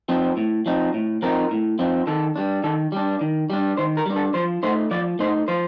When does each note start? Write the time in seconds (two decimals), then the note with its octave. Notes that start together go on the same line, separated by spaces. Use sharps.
0.09 F3 C4 D#4
0.37 A2
0.66 F3 C4 D#4
0.94 A2
1.22 F3 C4 D#4 A#4
1.51 A2
1.79 F3 C4 D#4
2.07 D#3 A4
2.36 G3 D4
2.64 D#3 A4
2.92 G3 D4
3.21 D#3
3.50 G3 D4
3.77 D#3 C5
3.97 A#4
4.06 G3 D4
4.16 A4
4.34 F3 C5
4.63 A3 D#4 C5
4.91 F3 D5
5.19 A3 D#4 C5
5.48 F3 C5